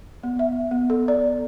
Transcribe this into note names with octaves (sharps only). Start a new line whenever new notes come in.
B3
E5
B3
A4
D5